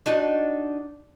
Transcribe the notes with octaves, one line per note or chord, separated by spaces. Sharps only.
D4 D#4 F#4